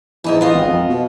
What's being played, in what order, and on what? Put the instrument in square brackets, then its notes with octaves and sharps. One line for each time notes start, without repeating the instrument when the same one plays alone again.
[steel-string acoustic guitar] G#2 D#4 A4 [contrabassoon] E3
[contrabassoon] E3 [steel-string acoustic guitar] B3 F4 D#5
[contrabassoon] G#1
F2
B2